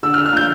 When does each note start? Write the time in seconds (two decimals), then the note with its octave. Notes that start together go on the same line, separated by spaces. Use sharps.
0.03 D3 E6
0.14 F6
0.18 D3
0.26 F6
0.33 F3 G6